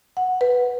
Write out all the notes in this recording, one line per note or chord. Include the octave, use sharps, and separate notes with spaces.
F#5
B4